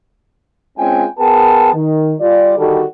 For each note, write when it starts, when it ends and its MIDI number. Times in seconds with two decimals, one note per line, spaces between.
0.77 1.05 56
0.77 1.05 60
0.77 1.05 61
0.77 1.05 65
0.77 1.05 79
0.77 1.05 80
1.19 1.71 59
1.19 1.71 68
1.19 1.71 70
1.19 1.71 79
1.19 1.71 81
1.73 2.14 51
2.20 2.54 55
2.20 2.54 65
2.20 2.54 74
2.58 2.82 50
2.58 2.82 51
2.58 2.82 55
2.58 2.82 66
2.58 2.82 69